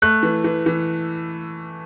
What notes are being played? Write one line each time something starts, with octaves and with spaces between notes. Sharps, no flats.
A3 F#6
E3
E3
E3